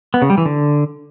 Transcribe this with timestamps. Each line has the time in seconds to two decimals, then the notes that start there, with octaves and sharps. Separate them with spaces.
0.14 B3
0.22 C#3
0.30 G3
0.38 E3
0.46 D3